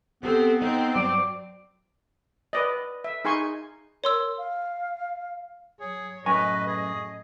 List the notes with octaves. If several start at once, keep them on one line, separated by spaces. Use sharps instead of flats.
B3 C4 G4 A4
C4 D#4
G2 F#3 D5 D6
B4 D5 D#5
E5
D#4 G#4 G#5 C6 C#6
A#4 C#5 C6 E6
F5
F#3 G#4 C#5
F#2 A2 B4 D#5 G#5 C#6 A#6
G#4